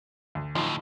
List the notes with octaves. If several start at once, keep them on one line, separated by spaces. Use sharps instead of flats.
D2
D2 A2 F3 D#4 C6